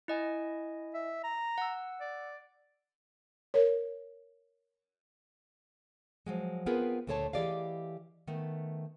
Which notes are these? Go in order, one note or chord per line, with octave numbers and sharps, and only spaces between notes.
E4 D#5 G#5
E5
A#5
F#5 E6
D5
A#4 C#5
F3 F#3 G#3
B3 C4 F4 G#4 A#4 B4
D2 A#2 A3 C5 C#5 A5
E3 G4 G#4 D5 D#5 F5
D#3 A3 B3